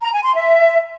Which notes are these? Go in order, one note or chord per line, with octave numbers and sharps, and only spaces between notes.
A#5
G#5
C6
E5